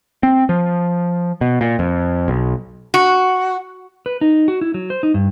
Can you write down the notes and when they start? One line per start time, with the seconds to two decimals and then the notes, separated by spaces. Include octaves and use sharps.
0.23 C4
0.49 F3
1.41 B2
1.61 A#2
1.79 F2
2.28 B1
2.94 F#4
4.06 B4
4.21 D#4
4.48 F#4
4.61 E4
4.74 F#3
4.90 C5
5.03 D#4
5.14 G2